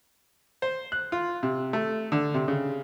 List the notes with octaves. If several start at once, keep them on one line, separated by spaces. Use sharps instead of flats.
C5
F#6
F4
C3
A3
D3
C3
C#3